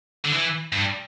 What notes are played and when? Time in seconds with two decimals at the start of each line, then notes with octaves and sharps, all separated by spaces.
0.25 D3
0.32 E3
0.73 G2